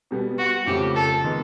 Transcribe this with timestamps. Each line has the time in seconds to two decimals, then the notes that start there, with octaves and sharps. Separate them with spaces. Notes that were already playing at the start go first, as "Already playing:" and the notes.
0.11 B2 G3 B3
0.38 F#4
0.66 F2 C#3 F3 A3 G4
0.96 A4
1.24 D#3 G#3 B3